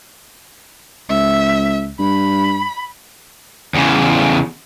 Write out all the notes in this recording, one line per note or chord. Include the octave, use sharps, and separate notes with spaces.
C#2 E5
G2 B5
E2 C#3